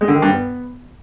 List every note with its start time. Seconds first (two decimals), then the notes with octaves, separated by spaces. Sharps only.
0.01 G#3
0.08 D3
0.15 D#3
0.22 G2
0.29 B3